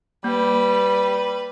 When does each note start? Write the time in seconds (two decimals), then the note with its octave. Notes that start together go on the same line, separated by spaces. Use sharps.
0.24 G3 A#3 B4